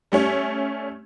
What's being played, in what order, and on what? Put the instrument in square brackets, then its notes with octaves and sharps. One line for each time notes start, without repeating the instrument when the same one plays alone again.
[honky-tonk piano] G3 A3 C#4